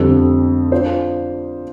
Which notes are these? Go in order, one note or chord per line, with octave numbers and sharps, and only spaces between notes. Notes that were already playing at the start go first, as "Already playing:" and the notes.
Already playing: F2 D3 G3 C4 A4
D4 F4 C5